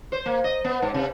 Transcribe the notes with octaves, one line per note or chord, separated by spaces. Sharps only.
C5
A#3
D#5
B3
G#2
C3